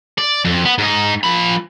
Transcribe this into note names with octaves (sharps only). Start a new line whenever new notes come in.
D5
F2
B3
G#2 D#4
F3 B5